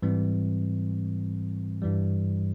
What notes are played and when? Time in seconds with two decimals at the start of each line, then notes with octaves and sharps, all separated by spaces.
0.03 G#2 E3 G3 C4
1.82 G2 E3 G3